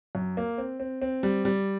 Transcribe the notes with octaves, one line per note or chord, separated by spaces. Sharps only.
F#2
A#3
C4
C4
C4
G3
G3